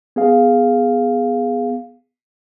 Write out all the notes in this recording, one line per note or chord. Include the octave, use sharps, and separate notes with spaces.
B3 G#4 F5